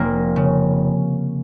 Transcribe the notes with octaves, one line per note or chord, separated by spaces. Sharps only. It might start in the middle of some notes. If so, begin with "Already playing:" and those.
Already playing: F1 A#3
C#3